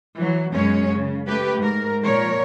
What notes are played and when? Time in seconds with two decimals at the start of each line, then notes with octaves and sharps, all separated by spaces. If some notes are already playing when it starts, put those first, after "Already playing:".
0.17 E3 F#3
0.53 F#2 B2 G#3 C#4 C#5
0.90 C#3
1.27 A3 G4 B4
1.58 G#2 A#4
2.03 A#2 F3 A#4 C#5